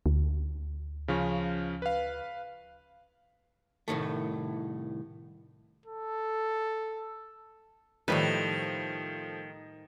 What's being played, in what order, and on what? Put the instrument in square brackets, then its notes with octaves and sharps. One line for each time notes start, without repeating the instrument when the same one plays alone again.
[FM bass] D2
[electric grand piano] C#3 F3 C#4
B4 F5
[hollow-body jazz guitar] C2 A2 D#3 A3
[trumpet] A4
[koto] A2 G3 B4 [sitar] D#3 [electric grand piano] F3 A3 C5